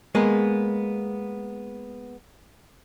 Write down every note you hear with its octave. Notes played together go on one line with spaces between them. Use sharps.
G#3 A#3 B3 G#4